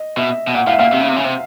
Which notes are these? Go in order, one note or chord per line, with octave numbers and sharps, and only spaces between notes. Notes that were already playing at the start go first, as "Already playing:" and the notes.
Already playing: D#5
B2 E5
B2
A#2 F#5
A2 F5
E5
A#2 F5
C3 E5
C#3
C3
C#3
C3